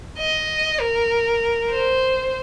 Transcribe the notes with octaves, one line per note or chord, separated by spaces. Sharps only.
D#5
A#4
C5